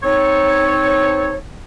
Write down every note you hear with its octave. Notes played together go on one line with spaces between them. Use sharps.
C4 D#4 A4 C#5